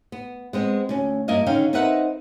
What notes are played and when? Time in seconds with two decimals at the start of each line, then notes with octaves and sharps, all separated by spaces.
0.12 B3
0.53 G#3 B3 C4
0.89 D2 C#4
1.28 G2 A#3 E4 D#5 F5
1.46 D3 D#3 C#4 F5 G5
1.73 C4 D#4 A#4 B4 E5 F#5